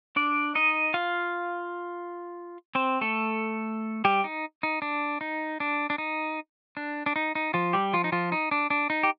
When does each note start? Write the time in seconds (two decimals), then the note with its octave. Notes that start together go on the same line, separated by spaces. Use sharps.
0.16 D4 D5
0.55 D#4 D#5
0.94 F4 F5
2.75 C4 C5
3.01 A3 A4
4.05 G3 G4
4.24 D#4
4.63 D#4
4.82 D4
5.21 D#4
5.60 D4
5.90 D4
5.98 D#4
6.77 D4
7.06 D4
7.16 D#4
7.35 D#4
7.54 F3 F4
7.73 G3 G4
7.93 F3 F4
8.04 D#4
8.12 F3 F4
8.32 D#4
8.51 D4
8.70 D4
8.90 D#4
9.03 G4